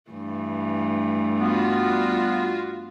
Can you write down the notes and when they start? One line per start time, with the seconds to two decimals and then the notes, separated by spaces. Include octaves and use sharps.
0.11 G2 E3 A3
1.40 G3 B3 F4 F#4